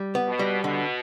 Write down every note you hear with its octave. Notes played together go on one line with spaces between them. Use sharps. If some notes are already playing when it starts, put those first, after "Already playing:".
Already playing: G3
B3
B2
G3
B2 D3